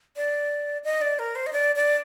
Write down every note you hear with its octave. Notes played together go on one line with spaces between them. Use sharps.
D5
D#5
D5
A#4
C5
D#5
D5
D5